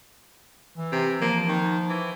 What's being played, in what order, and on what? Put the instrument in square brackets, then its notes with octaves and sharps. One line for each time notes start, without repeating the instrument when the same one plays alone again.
[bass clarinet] E3
[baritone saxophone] C3
[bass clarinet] F3 [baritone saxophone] A#3
[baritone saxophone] D#3
E3